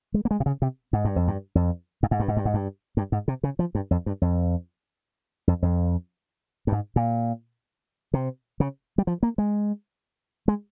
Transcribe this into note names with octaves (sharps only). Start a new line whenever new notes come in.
G#3
A#3
G#3
C3
C#3
C3
G#2
G2
F2
G2
F2
G2
G#2
G2
G#2
G2
G#2
G2
G2
G#2
C3
C#3
F3
G2
F2
G2
F2
F2
F2
G2
G#2
A#2
C3
C#3
G3
F3
A#3
G#3
G#3